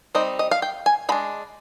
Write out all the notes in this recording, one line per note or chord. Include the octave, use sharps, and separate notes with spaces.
G3 C4 D#4 D#5
D#5
F5
G5
G#5
G#3 D4 B5